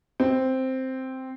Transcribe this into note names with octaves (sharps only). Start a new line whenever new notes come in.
C4